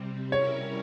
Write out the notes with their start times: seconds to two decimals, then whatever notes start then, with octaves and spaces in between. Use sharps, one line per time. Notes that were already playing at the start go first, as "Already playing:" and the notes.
Already playing: C3 G3 C4
0.32 G3 C#4 E4 A#4 C#5